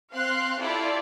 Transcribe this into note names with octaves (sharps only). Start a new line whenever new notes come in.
C4 F5 C6 F#6 C7
E4 F4 G4 A4 D5